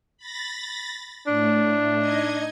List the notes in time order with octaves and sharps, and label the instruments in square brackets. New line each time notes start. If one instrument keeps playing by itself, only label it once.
[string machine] B5 A6 A#6
[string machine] A2 A3 [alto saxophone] D4
[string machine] D#4 D#5 G#6